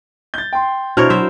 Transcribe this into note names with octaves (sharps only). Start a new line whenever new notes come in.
G6 A6
G5 C6
B2 D4 E4 A#4 C5 C#5 F6
F#3 F#4 C5 E5